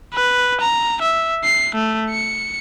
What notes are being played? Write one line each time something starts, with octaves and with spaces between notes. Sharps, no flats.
B4
A#5
E5
C7
A3
C#7